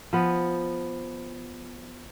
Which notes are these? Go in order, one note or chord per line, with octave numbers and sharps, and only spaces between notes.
F3 B3